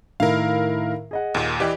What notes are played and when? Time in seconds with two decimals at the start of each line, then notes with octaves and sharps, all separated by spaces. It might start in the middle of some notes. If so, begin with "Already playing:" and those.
0.20 A2 D#3 E4 A#4 F5
1.11 G#4 D#5 F#5
1.35 D#2 A#2
1.60 E3 G4 B4 D5 D#5